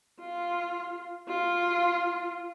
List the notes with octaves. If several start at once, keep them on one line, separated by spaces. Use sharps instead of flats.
F4
F4